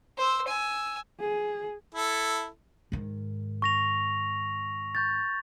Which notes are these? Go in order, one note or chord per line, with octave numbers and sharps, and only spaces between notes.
C5 E6
G#5 E6
G#4
E4 A4
G#2 D#3
C#6 A#6 F7
C#6 G6 A6